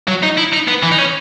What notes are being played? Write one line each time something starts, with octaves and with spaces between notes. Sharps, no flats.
F#3
D#4
E4
D#4
B3
E3
D#4
C#4